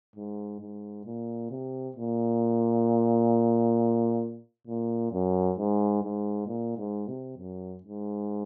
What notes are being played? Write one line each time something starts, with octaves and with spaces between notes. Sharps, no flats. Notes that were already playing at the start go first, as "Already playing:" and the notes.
G#2
G#2
A#2
C3
A#2
A#2
F#2
G#2
G#2
A#2
G#2
C3
F#2
G#2